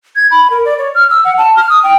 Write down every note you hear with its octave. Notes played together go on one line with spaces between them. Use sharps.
G#6
B5
A#4
D5
C#5
F6
E6
F#5
A5
F6
D#6
G5